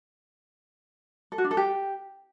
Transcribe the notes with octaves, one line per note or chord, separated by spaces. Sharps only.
A4
F#4
D4
A4
G4